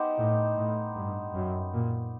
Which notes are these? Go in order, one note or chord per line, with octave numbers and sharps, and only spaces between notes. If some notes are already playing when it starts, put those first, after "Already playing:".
Already playing: B3 D#4 G4 C5
A2
A2
G2
F#2
A#2